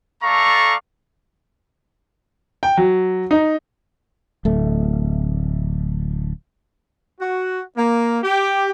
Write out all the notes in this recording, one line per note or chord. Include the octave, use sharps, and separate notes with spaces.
A3 A4 D5 F5 A#5 C#6
G5
F#3
D#4
D1 A3
F#4
A#3
G4